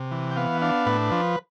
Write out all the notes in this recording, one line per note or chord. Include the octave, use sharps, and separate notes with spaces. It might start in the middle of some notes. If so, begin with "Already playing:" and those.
Already playing: C3
E3
G5
B3 F5
D4 F5
A2 B4
F3